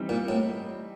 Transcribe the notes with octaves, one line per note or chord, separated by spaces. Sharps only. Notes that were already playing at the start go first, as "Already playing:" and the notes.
Already playing: E3 G3 C4 D#4
A#2
A2